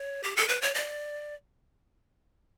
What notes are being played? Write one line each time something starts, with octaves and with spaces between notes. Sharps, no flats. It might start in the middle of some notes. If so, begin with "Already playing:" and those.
Already playing: C#5
G4
A4
B4
C#5
D5